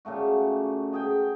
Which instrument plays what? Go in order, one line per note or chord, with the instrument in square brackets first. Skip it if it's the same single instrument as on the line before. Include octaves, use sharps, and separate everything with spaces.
[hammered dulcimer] A#2 C#3 A3 F#4
B2 G#4 G5